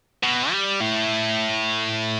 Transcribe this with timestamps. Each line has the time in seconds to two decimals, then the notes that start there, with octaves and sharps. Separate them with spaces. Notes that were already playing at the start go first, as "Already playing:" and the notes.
0.23 B2
0.51 G3
0.81 A2